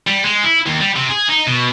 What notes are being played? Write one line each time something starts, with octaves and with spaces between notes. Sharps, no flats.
G3
G#3
E4
D#2
G3
C3
G#4
D#4
B2